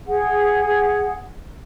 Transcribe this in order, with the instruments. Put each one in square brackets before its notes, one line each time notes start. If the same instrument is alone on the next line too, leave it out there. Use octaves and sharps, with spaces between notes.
[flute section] G#4 F#5